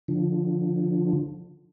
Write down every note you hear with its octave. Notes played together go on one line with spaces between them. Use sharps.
D3 F3